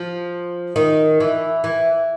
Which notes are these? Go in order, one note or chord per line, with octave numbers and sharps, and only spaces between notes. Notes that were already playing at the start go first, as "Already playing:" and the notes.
Already playing: F3
D#3
E3
E3